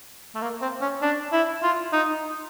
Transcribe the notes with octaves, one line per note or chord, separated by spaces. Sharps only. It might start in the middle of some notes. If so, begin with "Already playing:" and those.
A3
A#3
C4
C#4
D4
E4
F4
D#4